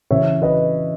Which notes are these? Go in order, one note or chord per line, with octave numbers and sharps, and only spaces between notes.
C#3 E3 C#5 E5
B4 D#5